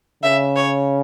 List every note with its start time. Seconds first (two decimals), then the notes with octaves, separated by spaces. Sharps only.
0.23 C#3 E5
0.56 C#5